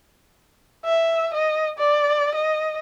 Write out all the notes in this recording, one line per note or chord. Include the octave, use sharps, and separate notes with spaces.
E5
D#5
D5
D#5